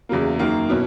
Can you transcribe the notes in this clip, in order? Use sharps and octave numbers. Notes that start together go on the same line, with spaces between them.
E2 C#3 F#3 A#3
F#2 D#3 A#3
B2 F#3 C#4 E4